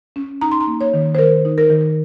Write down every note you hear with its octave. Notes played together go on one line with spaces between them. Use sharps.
C#4
D#4 A#5
C6
A#5
A#3
C#5
D#3
C5
D#3 A#4
D#4
A#4
D#3